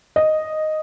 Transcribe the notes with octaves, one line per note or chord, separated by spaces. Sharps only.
D#5